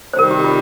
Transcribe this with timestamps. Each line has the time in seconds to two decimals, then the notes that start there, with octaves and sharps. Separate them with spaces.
0.13 C5
0.18 C3 D#3 G3 A#4
0.31 G4
0.44 F4